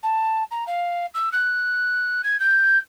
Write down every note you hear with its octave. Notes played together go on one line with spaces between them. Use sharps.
A5
A#5
F5
E6
F#6
G#6
G6